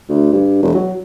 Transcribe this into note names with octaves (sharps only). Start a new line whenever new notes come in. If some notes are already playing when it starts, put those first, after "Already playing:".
D2
G2
E1
F#3